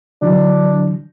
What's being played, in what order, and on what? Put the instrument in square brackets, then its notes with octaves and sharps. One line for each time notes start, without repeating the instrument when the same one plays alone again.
[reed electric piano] D3 E3 F#3 [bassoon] D4